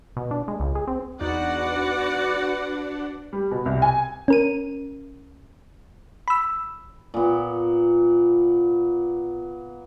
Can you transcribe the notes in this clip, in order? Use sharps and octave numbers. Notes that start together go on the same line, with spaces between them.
B2
D4
G#3
C#2
G#4
C4
E2 D4 D#4 F#4 B4 D5 F#5
G3
B2
C2
G#5
C#4 A#4 D#7
B5 E6
A#2 B3